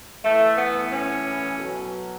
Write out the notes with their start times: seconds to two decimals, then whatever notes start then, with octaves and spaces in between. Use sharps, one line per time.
0.24 A2 E3 A3
0.58 B3
0.92 C#4
1.59 B2 F#3